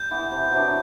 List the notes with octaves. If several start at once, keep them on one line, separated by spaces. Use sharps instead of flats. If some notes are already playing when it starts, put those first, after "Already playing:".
Already playing: G3 G6
E3 B3 E4
C3
F#3 B3 D4